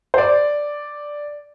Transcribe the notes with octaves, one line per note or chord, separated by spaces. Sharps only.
C5
D5